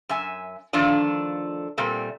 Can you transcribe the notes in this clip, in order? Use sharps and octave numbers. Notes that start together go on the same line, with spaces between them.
F#2 E5 G#5
D3 D#3 F3 A3 D4 F4
A#2 G3 A3 C4